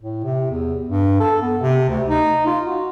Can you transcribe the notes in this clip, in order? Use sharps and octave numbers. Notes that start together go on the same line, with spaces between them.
A2
C3
E2
G2
A4
B3
C3
D2
D#4
F4
F#4